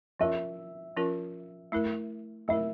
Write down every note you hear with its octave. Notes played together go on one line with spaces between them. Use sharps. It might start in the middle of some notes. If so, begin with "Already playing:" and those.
F3 C#4 F4 A#4 E5
F3 C#4 F4 A#4
A3 E4 A#4
A3 E4 A#4 E5